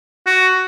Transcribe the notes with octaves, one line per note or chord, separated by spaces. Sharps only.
F#4